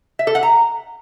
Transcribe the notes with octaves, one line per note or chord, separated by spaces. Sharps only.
E5
A4
F#5
A#5